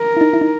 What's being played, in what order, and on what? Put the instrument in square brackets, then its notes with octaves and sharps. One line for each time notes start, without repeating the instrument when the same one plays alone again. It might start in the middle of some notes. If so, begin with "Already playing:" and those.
Already playing: [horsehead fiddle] A#4
[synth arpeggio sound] E4
D#4
E4
D#4